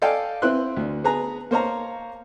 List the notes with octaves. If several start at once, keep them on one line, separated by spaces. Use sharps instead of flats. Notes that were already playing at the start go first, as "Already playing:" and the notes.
A4 D5 D#5 F5 G5 G#5
C4 E4 B4 C6 F#6
D2
B3 G#4 B4 A#5
A#3 C5 C#5 F5 A#5